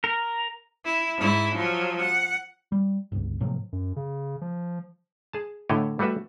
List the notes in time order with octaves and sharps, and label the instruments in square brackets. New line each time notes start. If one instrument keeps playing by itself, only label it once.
[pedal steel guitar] A#4
[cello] E4
G#2 E4
F3 F#3
F#5
[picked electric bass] G3
G1 C#2
A2 C3 F3 F#3
[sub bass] F#2
C#3
F3
[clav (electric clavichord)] G#4 A5
A2 D3 A3 E4 C#5 D#5
G3 A3 F#4 B4 E5